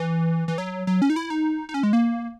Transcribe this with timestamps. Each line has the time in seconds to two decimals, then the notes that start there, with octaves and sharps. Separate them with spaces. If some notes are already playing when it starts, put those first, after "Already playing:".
Already playing: E3
0.48 E3
0.58 F#3
0.87 F#3
1.02 C#4
1.10 D#4
1.16 E4
1.30 D#4
1.69 D#4
1.74 C#4
1.83 G#3
1.93 A#3